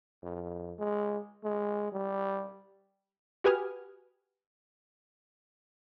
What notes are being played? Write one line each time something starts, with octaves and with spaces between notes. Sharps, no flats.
F2
G#3
G#3
G3
F#4 G4 B4 G#5 D#6 F6